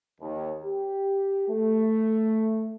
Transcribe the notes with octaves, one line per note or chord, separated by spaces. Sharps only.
D#2
G4
A3